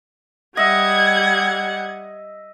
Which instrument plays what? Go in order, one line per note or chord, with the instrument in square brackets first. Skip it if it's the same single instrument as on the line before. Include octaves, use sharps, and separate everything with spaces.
[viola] G3 F#5 [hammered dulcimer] D#5 E5 [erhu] G#6